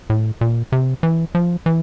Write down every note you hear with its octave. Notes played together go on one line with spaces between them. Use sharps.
A2
A#2
C3
E3
F3
E3